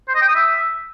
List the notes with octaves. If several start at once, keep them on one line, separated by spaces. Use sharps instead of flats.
C5
D#5
G5
D#6
E5